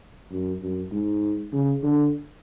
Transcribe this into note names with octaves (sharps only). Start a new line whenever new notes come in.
F#2
F#2
G#2
C#3
D3